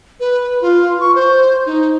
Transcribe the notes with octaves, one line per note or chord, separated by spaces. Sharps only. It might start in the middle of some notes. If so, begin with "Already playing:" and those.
B4
F4
C#6
C5
D#4